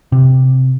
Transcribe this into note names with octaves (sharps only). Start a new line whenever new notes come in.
C3